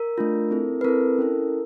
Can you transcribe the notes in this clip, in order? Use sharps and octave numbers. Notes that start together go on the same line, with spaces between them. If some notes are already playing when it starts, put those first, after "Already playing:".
Already playing: A#4
A3 D4 F4
C4 E4 A4
B4
C4 E4 A4 A#4
C#4 E4 A4